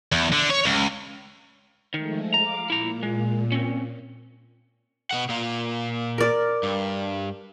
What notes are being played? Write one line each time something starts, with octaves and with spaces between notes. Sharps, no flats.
E2
D3
C#5
C#2
D#3 F3 G#3 A3
F5 A#5 D6
A#2 E4 A#5
G#3
C4 C#4
B2 D#3 F#5
A#2 F4
A#4 D5
G2